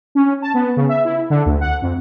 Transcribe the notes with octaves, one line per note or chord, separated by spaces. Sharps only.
C#4
A5
B3
C#3
E5
E4
D3
D2
F#5
F2